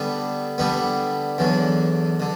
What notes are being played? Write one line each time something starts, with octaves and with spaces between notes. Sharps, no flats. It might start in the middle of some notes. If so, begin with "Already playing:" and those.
Already playing: D3 G3 B3
D3 G3 B3
E2 D3 F#3
D3